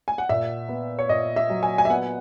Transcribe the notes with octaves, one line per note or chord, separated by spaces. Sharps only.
G#5
F#5
A#2 E5
B3
C#5
A#2 D#5
E5
F#3
G#5
G#5
E5
B3 F#5